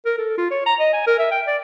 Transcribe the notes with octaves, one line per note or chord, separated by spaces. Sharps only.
A#4
A4
F4
C#5
A#5
D#5
G#5
A#4
E5
G5
D5